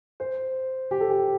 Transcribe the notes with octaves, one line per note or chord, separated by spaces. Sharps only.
C5
G4
A4
G4